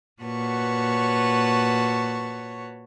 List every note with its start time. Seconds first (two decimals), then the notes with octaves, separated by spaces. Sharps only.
0.22 A#2 F#4 B4 C#5 A5 C#6